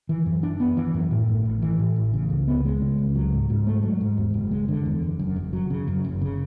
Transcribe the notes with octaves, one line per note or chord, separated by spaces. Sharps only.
E3
F#2
D4
B3
E3
F#2
A2
A1
A1
E3
A2
A1
C#3
C#2
B3
G#3
C#3
C#2
F#3
G#2
G#2
A3
F#3
G#2
E2
F#1
G#3
D3
E2
F#1
F#2
F#1
F#3
C#3
F#2
F#1
C#3